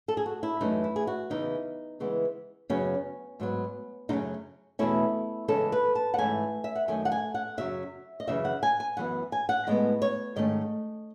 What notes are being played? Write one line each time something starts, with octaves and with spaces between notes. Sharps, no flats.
A4
G#4
F#4
E4
F#2 E3 A3 C#4 D#4
E4
G#4
F#4
E2 C#3 E3 D#4
C#3 E3 G#3 B3
F#2 C#3 F#3 B3 C#4
G#2 F#3 B3
F#2 C#3 F#3 A3 C#4 D#4
E2 B2 A3 C#4 E4
C#3 E3 G#3 C#4 A4
B4
A5
F#5
G#2 E3 A3 C#4 G#5
E5
F#5
F#2 D#3 A3 C#4 G#5
F#5
G#5
F#5
F#2 C#3 F#3 C#4 E5
D#5
F#2 C#3 E3 C#4 E5
F#5
G#5
G#5
F#2 E3 B3 F#5
G#5
F#5
A2 G#3 B3 D#5
C#5
G#2 D#3 A3 C#4 D#5